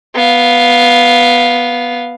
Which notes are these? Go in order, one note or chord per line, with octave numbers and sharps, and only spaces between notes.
B3 F5